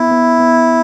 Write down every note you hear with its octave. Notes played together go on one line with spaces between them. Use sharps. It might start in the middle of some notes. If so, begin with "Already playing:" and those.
Already playing: B3 E4
B3
B3